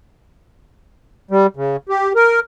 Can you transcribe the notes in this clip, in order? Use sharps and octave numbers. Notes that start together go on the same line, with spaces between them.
G3
C#3
G4
A#4